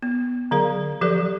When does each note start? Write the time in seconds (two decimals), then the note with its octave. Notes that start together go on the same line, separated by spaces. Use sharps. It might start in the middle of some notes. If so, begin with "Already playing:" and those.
0.02 B3
0.51 D3 F#3 G#4 A#4 F5
1.01 F3 F#3 G4 A4 B4